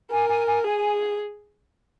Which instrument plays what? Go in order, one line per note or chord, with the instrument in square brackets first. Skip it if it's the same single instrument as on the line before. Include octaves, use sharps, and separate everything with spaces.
[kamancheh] A#4 [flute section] G#5
[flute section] G#5
G#5
[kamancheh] G#4 [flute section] G#5